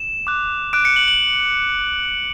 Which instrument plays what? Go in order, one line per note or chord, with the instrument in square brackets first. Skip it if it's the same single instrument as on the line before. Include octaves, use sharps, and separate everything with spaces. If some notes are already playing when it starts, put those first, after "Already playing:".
Already playing: [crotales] E7
D6 F#6
D6 F#6 D7
C#7
F#7
F#7